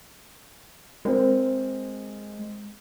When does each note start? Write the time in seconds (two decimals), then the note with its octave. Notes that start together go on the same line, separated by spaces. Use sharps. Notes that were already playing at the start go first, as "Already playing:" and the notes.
1.05 G#3 C4 A#4